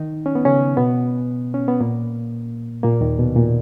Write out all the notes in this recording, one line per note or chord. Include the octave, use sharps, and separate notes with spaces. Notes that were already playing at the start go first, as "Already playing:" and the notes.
Already playing: D#3 D#4
C#4
B3
C#3 C#4
B2 B3
C#4
B3
A#2 A#3
A#2 A#3
D#2 D#3
B2
A#2